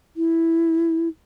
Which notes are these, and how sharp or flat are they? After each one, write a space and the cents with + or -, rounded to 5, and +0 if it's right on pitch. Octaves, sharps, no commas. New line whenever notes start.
E4 +0